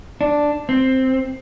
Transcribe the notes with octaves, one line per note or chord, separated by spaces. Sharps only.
D4
C4